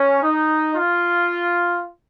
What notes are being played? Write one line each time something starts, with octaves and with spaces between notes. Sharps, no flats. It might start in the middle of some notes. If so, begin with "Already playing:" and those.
Already playing: C#4
D#4
F4